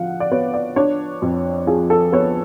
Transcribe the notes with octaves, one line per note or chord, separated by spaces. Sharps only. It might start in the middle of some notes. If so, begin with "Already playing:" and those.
Already playing: D3 F3 F5 F#5
D5
B3 C#5
D5
D4 C#5
F2
F3 G#4
A4
B3 C#5